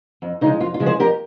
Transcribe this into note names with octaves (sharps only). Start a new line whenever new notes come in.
F2
C#3 F3 G#3 D#4
F2 F4
F4
C#3 F3 G#3
G#4 C5
F2 G4 A#4